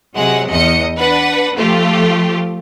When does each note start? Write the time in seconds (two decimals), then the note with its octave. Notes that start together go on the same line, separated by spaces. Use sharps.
0.17 C3 F#3 G#3 F#5
0.49 E2 D#5 C#7
0.97 D4 B4 F#5
1.55 F3 A3 F4 G4